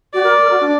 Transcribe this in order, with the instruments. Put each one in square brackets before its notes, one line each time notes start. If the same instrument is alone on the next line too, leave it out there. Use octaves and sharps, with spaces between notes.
[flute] F#4 [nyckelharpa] D5
[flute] A#4
A#4
F#4
D4